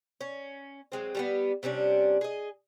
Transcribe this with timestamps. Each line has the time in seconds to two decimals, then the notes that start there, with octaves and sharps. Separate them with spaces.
0.21 C#4
0.92 F#3 G#3 C4
1.15 G3 A3 B3
1.63 C3 G3 C#4 D4
2.21 G#4 D#5